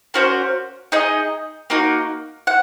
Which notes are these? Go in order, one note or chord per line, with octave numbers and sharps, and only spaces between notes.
A#3 C#4 F#4 C5
D#4 G#4 D#5
A#3 D#4 F#4
F#5